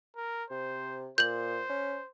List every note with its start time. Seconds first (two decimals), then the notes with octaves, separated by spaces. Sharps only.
0.16 A#4
0.51 C3 C5
1.18 A#2 C5 G6 F#7
1.69 C#4